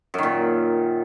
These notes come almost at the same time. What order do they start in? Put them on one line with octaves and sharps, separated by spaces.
F#2 D#3 A#2